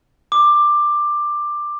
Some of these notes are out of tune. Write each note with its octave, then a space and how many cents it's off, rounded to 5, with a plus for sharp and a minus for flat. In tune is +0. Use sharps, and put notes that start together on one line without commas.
D6 +15